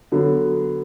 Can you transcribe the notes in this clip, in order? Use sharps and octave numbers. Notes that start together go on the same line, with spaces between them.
D3 F#3 B3